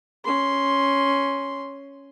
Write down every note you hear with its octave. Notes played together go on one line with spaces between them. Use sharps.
C#4 C6